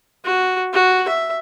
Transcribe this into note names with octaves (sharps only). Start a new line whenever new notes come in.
F#4
F#4
E5